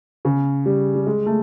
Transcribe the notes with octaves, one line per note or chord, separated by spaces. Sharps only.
C#3
G3
G3
G#3
A3